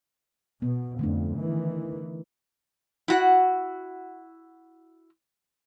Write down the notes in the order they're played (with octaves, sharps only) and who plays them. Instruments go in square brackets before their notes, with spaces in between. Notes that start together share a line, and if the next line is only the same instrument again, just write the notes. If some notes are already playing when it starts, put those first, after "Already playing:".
[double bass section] B2 [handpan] B3
[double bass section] F2 G#2 [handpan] D3 A3 D4
[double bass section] D#3 E3
[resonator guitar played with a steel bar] E4 F#4 F#5